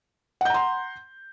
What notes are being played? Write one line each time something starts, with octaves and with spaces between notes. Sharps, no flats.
F#5 A#5 C6 G6